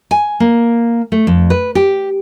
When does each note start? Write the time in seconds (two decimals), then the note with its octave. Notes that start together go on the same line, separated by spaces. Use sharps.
0.11 G#5
0.40 A#3
1.12 A3
1.27 F2
1.50 B4
1.75 G4